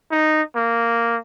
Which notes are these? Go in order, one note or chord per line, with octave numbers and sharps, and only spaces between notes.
D#4
A#3